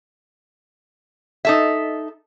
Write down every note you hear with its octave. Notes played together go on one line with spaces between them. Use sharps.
D#4 A4 E5